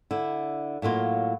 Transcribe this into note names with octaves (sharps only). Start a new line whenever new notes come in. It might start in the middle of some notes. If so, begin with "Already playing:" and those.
D3 E4
A2 F#3 A#3 F4